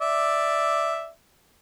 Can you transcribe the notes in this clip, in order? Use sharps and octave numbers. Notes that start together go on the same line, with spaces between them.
D5 E5